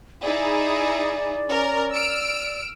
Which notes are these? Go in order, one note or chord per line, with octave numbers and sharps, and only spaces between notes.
D#4 E4 G#4 D5
C#4 A#4
E6 F6 D7